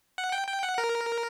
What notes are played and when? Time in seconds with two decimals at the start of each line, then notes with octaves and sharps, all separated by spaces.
0.18 F#5
0.32 G5
0.48 G5
0.63 F#5
0.78 A#4